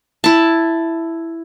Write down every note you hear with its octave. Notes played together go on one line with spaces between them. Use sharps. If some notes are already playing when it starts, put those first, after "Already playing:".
E4 A5